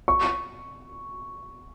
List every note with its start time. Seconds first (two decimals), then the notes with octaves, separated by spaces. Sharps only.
0.08 C#6